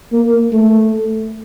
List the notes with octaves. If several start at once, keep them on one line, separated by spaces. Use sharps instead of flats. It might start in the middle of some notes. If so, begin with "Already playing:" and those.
A#3
A3